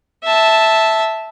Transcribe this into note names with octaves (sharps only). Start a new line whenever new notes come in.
E5 A5